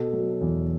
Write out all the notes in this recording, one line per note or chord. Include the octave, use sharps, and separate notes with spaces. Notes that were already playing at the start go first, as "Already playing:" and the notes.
Already playing: B2 A4
F#3
E2